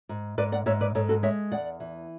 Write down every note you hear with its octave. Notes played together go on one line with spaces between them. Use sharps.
G#2
G#2 B4 D5
D5 F#5
G#2 C#5 E5
B4 D5
G#2 A4 C#5
F#4 A4
G#3 C#5 E5
E2 D5 F#5
E3